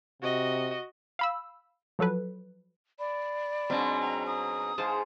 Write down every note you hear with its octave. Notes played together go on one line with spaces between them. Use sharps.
C3 F#4 D#5
F5 B5 E6
F3 F#3 A4 B4
D5 B5
G#2 B2 F#3 C4 D4
G5 A#5
A#5 D#6
G#2 G#4 C5 F5 A5